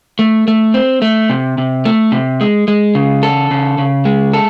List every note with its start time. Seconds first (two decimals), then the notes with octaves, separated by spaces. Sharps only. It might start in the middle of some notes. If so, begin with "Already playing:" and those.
0.19 A3
0.48 A3
0.74 C4
1.02 A3
1.30 C3
1.58 C3
1.85 A3
2.12 C3
2.41 G#3
2.68 G#3
2.95 C#3
3.23 A4
3.51 C#3
3.78 C#3
4.05 G#3
4.33 A4